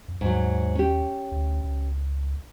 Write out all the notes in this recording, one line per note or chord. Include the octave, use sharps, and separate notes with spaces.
F2
D#2 G#2 F#3
C#4 G4
D2
C#2